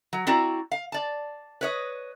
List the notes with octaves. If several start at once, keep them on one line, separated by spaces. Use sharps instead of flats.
F#3
C4 E4 F#4 D5 A#5
F5
D5 A5
B4 C#5 D#5